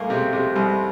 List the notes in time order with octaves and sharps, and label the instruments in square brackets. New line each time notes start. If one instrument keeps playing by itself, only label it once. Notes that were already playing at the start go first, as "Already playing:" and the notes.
Already playing: [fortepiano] C2 A#3 [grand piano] A3
[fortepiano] C3 [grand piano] G#3
[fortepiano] C3 [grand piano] G#3
[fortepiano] C2 [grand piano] G3